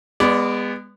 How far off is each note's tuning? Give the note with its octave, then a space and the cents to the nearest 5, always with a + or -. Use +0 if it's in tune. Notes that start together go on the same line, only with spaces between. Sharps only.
G#3 -35 B3 +0 D5 -10